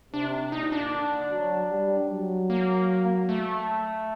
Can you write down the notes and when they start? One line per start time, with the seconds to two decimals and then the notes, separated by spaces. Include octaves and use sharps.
0.13 C3 D4
0.52 A#2 D#4
0.72 D4
0.92 D3
1.32 F#3
1.71 G3
2.11 F#3
2.50 A#3
3.29 A3